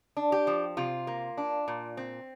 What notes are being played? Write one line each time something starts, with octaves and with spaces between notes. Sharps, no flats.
D4
G4
F3
C3 F4
A#3
D4
A#2
C4